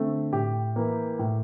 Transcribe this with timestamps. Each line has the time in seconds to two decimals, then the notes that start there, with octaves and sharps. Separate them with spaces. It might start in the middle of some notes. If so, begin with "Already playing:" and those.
Already playing: D3 A3 C4
0.32 A2 G4
0.76 E3 A#3
1.19 A2